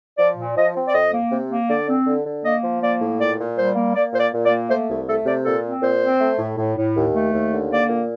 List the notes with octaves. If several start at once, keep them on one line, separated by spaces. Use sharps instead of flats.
F3 D5
A#2
F3 D#5
C4
D5
F2 D#5
A#3
C3
A#3
D3 D5
C4
D3
D3
A#3 D#5
F3
A#3 D5
A2
A#2 D5
A#2
G3 C5
A#3
A#3 D5
A#2 C5
D5
A#2
D5
A#3
A3 C5
C2
A3 A4
C3 D5
A#2 A4
C4
A#2 C5
C4
A3
A2
A2
A2
D#2
A3
D#2
D3
A#3 D5
A#2